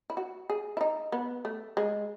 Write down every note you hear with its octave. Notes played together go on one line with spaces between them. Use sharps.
E4
F#4
G#4
E4
D#4
B3
A3
G#3